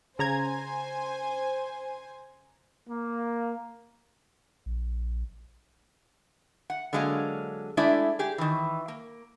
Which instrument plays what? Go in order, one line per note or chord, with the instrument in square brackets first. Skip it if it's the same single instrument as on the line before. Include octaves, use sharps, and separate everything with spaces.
[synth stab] C#3 A#5 G#6 [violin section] C5 G#5
[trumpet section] A#3
[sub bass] A#1
[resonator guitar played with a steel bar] F#5
D3 F#3 G#3 A#3 F5
G#3 A3 D4 E4 D5
G4 G#4
D#3 E3
A#3